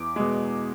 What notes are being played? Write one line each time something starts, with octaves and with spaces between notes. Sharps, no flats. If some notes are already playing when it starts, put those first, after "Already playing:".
Already playing: E2 D6
B2 G#3